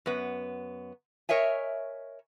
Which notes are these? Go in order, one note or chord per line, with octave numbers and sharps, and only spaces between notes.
F#2 B3
A#4 C#5 D#5 E5 G#5